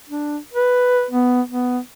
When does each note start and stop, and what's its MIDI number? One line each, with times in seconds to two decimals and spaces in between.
0.09 0.37 62
0.53 1.05 71
1.10 1.42 59
1.49 1.78 59